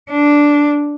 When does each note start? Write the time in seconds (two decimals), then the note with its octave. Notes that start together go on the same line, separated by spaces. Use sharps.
0.11 D4